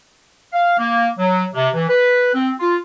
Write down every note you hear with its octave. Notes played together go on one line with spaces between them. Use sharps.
F5
A#3
F#3
C3
E3
B4
C4
F4